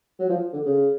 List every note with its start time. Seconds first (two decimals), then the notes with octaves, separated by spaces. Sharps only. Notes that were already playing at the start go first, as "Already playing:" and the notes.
0.19 F#3
0.29 F3
0.53 D3
0.65 C#3